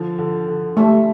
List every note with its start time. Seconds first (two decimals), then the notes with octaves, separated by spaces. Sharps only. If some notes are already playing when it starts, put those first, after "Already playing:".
Already playing: D3 F3
0.18 D3
0.48 D3
0.77 G3 A3